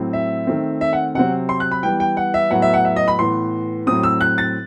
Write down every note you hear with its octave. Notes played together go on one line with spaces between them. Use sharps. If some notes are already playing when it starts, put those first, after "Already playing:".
Already playing: A2 F#3 C4
E5
D#3 A3 C4
E5
F#5
C3 F#3 C4 F#5
C6
F#6
B5
E3 G3 B3 G5
G5
F#5
E5
A2 F#3 B3 F#5
E5
F#5
E5
D#5
B5
A2 E3 B3 C6
A2 F#3 C4 D#6
E6
F#6
A6